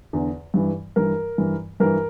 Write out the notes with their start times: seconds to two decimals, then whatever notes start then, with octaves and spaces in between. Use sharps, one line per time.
0.13 E2 D3
0.54 G2 E3
0.96 G2 E3 A#4
1.38 G2 E3
1.80 G2 E3 A#4